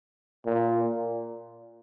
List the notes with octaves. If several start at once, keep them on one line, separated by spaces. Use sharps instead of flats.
A#2